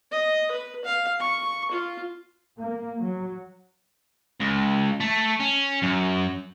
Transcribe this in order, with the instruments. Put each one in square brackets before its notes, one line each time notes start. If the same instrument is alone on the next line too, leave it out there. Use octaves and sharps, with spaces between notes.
[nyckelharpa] D#5
B4
F5
C#6
F4
[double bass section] A#3
F#3
[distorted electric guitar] C#2
A3
C#4
F#2